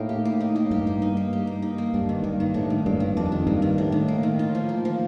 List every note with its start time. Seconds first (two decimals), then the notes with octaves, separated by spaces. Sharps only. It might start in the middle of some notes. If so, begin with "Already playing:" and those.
Already playing: A2 A#3 D#4
0.09 G4
0.25 A#3
0.41 D#4
0.56 A#3
0.71 G2 G4
0.87 A#3
1.02 D#4
1.17 A#3
1.33 G4
1.47 A#3
1.62 D#4
1.78 A#3
1.94 G2 D4
2.09 D#3
2.24 G2 A#3
2.40 D#3
2.54 A2 D4
2.70 D#3
2.86 G2 A#3
3.00 D#3
3.17 F2 D4
3.32 D#3
3.47 G2 A#3
3.62 D#3
3.78 A2 D4
3.92 D#3
4.08 A#3
4.23 D#3
4.39 F4
4.55 F3
4.69 A#3
4.85 F3